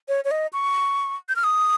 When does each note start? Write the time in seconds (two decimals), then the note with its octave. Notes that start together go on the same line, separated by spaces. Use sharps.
0.09 C#5
0.25 C#5
0.31 D#5
0.53 C#6
1.29 G6
1.36 F6
1.44 D#6